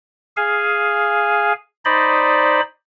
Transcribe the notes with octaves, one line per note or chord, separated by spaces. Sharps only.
G#4 F5 G#5
D#4 C5 D5 D#5 B5